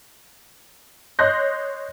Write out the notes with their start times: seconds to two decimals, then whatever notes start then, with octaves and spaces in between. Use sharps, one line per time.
1.19 C#5 D#5 C6 F#6 G6 A#6